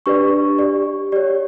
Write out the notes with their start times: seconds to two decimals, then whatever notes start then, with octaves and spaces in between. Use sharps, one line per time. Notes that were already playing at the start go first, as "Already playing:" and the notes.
0.06 D4 G4 B4 D5 C#6
0.58 G4 D5
1.12 G4 C#5 D5